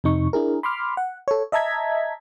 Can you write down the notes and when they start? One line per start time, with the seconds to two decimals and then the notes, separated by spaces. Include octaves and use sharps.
0.04 F2 C3 D#4 C#6
0.33 D4 E4 G#4 A#4
0.63 B5 C6 D6 F6
0.97 F#5
1.28 A4 C#5
1.52 D#5 E5 A5 A#5 G#6 B6